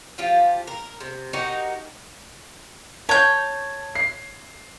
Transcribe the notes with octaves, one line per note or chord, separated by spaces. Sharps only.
F3 F4 G4
A#4
C3
D#4 F#4 G4 A#4
C#5 A5 G6
C7